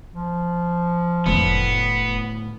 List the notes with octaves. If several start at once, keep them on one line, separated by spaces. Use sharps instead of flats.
F3
F1 A2 D3 A3 B3